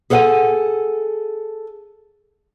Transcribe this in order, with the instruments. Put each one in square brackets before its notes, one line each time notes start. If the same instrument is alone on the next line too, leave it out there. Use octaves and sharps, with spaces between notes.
[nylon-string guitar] G#4 A4 C5 F5 F#5 G#5